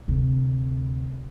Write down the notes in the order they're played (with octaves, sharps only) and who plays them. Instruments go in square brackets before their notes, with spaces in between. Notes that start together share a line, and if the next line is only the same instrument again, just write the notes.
[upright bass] D2 C3